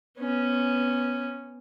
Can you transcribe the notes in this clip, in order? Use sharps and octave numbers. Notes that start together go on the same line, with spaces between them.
B3 C#4